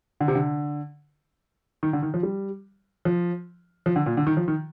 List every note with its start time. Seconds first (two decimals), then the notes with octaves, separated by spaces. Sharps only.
0.21 D3
0.28 C3
0.35 D3
1.83 D#3
1.93 D3
2.02 D#3
2.14 F3
2.23 G3
3.05 F3
3.86 F3
3.96 D3
4.06 A#2
4.17 D3
4.27 D#3
4.37 F3
4.48 D#3